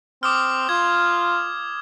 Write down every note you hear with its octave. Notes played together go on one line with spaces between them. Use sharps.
C4 D6 D#6 F6
F4 G#6